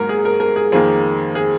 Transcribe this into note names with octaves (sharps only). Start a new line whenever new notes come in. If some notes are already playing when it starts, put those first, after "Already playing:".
Already playing: G#2 F#3 A#3 A#4
G#4
A#4
A#4
G#4
F2 D#3 A#3 G#4
G#4